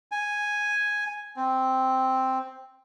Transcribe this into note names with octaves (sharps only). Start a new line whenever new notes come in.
G#5
C4